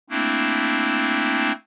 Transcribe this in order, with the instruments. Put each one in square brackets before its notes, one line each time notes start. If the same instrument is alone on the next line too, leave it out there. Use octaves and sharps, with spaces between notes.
[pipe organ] A3 A#3 C4 D4 E4